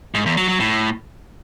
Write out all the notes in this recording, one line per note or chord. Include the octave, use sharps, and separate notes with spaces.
G#2
E2
F#3
F#3
A2